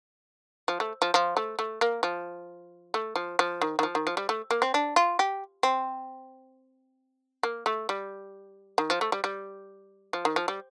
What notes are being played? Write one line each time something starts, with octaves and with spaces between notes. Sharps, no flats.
F3
A3
F3
F3
A3
A3
A#3
F3
A3
F3
F3
D#3
D#3
F3
D#3
F3
G3
A3
A#3
C4
D4
F4
G4
C4
A#3
A3
G3
D#3
F3
A3
G3
G3
F3
D#3
F3
G3